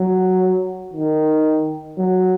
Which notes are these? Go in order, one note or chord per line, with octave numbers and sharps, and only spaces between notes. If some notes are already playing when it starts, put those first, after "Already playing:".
Already playing: F#3
D#3
F#3